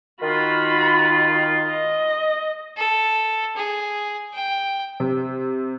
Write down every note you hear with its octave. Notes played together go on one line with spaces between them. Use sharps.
D#3 F4 F#4 B5
D#5
A4
G#4
G5
C3